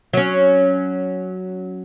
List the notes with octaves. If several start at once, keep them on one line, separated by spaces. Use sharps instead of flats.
F#3 C#4